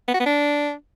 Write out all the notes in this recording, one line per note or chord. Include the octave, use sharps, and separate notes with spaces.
B3
F#4
B3
D4